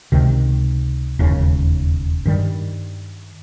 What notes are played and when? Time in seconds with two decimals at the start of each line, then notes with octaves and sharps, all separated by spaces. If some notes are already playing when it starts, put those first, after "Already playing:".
0.12 C#2 C3 D#3
1.19 E1 D#2 C#3
2.25 G2 D#3 G3